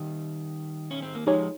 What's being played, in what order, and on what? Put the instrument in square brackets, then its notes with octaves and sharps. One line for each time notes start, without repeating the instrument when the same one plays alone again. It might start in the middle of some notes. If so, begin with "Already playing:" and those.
Already playing: [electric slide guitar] D#3 G3
C#4
C4
A#3
[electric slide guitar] F3 G#3 [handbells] D#4 G4 C#5 G#5